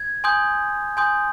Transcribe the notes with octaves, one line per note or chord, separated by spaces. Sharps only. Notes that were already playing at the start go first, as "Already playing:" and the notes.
Already playing: G#6
G#5 C6 D#6 G6
G#5 C6 D#6 G6